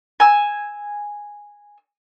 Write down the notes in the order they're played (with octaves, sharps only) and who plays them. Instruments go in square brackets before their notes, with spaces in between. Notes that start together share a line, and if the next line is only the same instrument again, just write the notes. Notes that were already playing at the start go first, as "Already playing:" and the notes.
[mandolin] G#5 E6